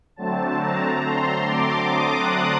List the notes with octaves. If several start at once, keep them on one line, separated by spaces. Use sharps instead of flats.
D3 F#3 A3 C4 A5
A#5
C6
D6
D#6
F#6